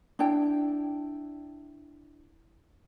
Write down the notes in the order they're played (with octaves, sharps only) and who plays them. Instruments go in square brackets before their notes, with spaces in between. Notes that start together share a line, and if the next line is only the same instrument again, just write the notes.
[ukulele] D4 E4 G5